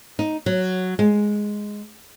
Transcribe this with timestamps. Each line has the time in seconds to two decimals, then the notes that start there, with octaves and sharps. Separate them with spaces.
0.19 D#4
0.46 F#3
0.99 G#3